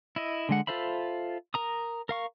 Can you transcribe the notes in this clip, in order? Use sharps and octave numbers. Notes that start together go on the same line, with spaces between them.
E4 D#5
D3 G#3 F#5
F4 A4 C5 E5 B5
A#4 A#5 D#6
A#4 F5 C#6